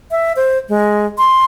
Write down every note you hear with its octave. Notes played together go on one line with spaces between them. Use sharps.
E5
C5
G#3
C6